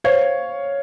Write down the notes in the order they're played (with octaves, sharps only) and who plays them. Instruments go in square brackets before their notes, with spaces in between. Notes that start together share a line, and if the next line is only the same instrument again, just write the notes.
[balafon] C5 [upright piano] C#5 F5